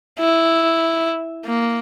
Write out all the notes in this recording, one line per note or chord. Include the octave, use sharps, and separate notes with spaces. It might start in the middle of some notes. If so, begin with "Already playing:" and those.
E4
A#3